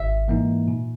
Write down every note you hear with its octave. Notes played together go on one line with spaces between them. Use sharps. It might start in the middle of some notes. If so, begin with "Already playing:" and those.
Already playing: G#1 E5
G#2 E3 A#3 D#4
A#2